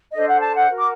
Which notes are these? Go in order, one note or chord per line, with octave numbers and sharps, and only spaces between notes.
D4 A4 C5 D#5
F#5
A5
F#5
F#4 A#4
D6